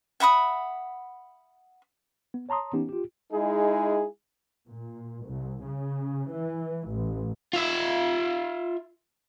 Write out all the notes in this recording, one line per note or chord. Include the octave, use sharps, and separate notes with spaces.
E5 F#5 B5 D#6
B3
C#5 A5 A#5 C6 D#6
E3 B3 C#4 D#4 G4
F4 G4
G#3 D#4 E4 G#4
A#2
C2
C#3
E3
A1
F4 E5